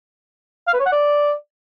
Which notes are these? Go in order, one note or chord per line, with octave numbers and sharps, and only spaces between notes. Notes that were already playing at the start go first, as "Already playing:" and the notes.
F5
B4
C#5
F#5
D5